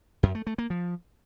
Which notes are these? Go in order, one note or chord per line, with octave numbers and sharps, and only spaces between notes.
F#2
A3
A3
A#3
F3